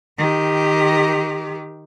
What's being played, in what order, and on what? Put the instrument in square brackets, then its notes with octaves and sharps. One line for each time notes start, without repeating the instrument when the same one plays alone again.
[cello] D#3 G4